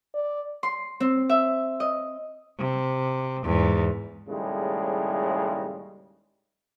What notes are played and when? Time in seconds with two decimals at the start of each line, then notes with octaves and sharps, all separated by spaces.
0.14 D5
0.63 C6
1.00 C4
1.29 E5
1.80 D#5
2.58 C3
3.43 E2 G#2
4.28 D#2 A2 C#3 G3 G#3